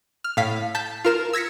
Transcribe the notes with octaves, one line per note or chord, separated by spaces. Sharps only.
F6
A2 F5 B6
A5 G6 B6
F4 A#4 E7
E6 G#6 A#6 B6 C#7